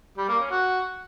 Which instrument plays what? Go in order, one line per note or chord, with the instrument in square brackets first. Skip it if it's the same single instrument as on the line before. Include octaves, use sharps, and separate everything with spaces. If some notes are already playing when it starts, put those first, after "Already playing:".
[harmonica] G3
A#3
C#4
F#4